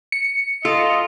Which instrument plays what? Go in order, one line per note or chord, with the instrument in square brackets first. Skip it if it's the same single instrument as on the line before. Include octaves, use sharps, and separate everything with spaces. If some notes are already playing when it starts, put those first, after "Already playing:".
[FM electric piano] C#7
[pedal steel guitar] F4 [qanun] A4 [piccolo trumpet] D#5